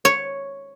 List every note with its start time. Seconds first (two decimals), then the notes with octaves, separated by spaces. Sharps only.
0.05 C#5